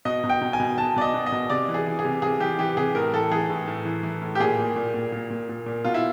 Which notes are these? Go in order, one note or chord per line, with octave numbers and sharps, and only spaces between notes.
B2 D#5
B2
G5
B2
G#5
B2
B2 A5
B2 D5 D#5
B2
D#5
B2
C3 D5
E3
G#4
E3
G#4
C3
C3 G#4
E3 G4
E3 G4
C3 G#4
A2 A#4
E3 A4
E3 G#4
A2
A2
E3
E3
A2
G4
A#2 G#4
A#2
A#2
A#2
A#2
A#2
A#2
A#2
B2 F4
E4